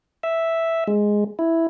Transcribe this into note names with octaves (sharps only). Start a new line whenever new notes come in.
E5
G#3
E4